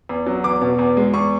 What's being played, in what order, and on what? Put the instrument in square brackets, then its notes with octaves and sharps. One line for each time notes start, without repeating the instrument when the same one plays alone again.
[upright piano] E2
F#3
E2 D6
B2
E2
G#3
E2 C#6